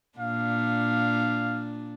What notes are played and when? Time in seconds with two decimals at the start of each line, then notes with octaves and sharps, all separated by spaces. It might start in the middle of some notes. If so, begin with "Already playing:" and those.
0.19 A#2 D4 F5